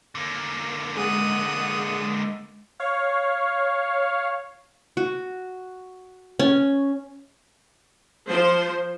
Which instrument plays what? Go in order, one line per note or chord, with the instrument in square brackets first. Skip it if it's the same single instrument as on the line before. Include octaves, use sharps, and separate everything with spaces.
[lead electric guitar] D3 A#3
[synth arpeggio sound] G#3 [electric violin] F#5 D#6
[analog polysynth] C#5 F5
[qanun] F#4
C#4
[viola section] F3 C5